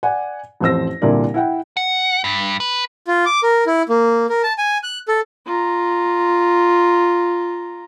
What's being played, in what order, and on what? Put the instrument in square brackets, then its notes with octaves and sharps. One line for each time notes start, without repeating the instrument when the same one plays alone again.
[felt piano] D5 F#5 G#5
A1 F2 C5 E6 A#6
C2 A#2 D3 E4 A#4 D5
E4 F#5 G5
[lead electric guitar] F#5
G2
B4
[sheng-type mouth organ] F4
D6
A#4
E4
A#3
A#4
A5
G#5
F#6
A4
[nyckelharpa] F4 A#5